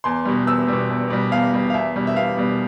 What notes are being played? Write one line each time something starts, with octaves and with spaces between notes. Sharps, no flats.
E2 C6
B2 G3
E2 E6
B2 G3
E2
B2 G3
E2 F5
B2 G3
F5
E2 E5
B2 G3
E5
E2 F5
B2 G3